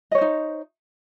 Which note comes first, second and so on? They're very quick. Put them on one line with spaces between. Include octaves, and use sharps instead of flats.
D#5 C#5 C5 D#4